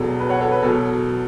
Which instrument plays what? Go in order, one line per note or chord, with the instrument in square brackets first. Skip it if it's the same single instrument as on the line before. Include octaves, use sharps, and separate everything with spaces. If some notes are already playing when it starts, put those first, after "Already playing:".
Already playing: [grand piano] E1 E2 B2 F#3 A4
B4
C#5 F#5
A4 C#5
B4
E2 B2 F#3 A4